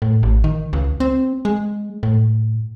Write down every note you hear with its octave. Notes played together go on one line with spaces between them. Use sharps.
A2
A1
D#3
C#2
C4
G#3
A2